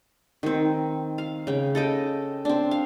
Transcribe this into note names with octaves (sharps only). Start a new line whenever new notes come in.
D#3 C4
F5
C#3 G5
A4 D#5 G5
C4 D4
F5